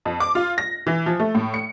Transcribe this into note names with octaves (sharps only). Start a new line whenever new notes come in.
F2
D6
F4
A#6
E3
F3
A3
A2
C#7